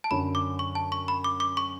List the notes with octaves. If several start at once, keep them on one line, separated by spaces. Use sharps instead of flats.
A5
F#2 D3 F#3 B5
D6
C#6
A5
C#6
B5
D6
D6
C#6